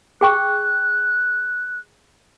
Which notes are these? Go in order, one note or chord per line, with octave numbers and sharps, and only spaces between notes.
G#4 G5 C#6 F#6